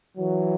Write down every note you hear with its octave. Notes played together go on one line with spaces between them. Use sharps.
E3 F#3